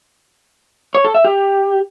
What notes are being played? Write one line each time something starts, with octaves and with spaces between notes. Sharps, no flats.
C#5
A4
E5
G4